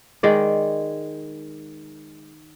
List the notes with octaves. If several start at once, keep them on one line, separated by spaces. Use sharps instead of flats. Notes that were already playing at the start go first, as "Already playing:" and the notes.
D#3 G#3 D5